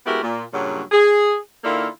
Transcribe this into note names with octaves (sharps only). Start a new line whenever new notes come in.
G#3 B3 E4 F#4 G4 A#4
A#2
G2 A#2 C#3 F#3
G#4
D#3 A#3 D4 E4 F4 A4